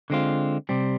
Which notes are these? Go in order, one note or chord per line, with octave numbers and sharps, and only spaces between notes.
D3 G#3 C4 F4
C3 G3 C4